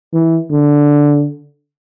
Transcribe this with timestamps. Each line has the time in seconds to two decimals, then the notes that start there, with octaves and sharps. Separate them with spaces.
0.13 E3
0.51 D3